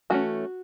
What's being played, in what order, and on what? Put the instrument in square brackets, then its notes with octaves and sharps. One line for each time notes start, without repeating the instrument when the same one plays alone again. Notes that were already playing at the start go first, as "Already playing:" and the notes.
[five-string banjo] E3 A3 C#4 F#4